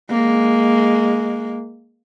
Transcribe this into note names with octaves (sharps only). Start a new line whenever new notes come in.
G#3 A#3